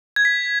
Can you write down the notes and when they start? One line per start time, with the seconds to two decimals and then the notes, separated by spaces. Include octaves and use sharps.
0.16 G#6
0.25 B6